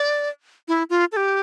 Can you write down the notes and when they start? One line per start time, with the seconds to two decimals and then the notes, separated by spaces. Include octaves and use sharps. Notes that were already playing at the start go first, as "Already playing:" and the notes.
Already playing: D5
0.68 E4
0.90 F4
1.12 A4
1.17 G4